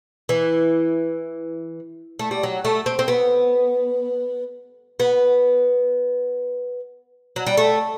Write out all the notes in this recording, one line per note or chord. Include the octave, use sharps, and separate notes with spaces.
E3
A3
G3
F#3
A3
C4
C4
B3
B3
F#3
G3
A3